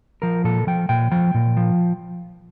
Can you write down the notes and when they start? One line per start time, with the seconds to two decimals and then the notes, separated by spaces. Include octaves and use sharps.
0.22 F3 A#4
0.44 A#2 A4
0.67 F3 G5
0.89 A#2 G5
1.12 F3 G5
1.34 A#2
1.57 F3